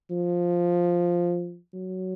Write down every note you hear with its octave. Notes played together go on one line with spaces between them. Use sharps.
F3
F#3